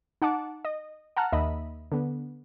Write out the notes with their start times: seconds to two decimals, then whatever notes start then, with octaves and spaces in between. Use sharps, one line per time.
0.22 D#4 F#5 A5 D6
0.65 D#5
1.17 F#5 A5 A#5 F6 F#6
1.32 D#2 D#5 E5 B5
1.92 D3 B3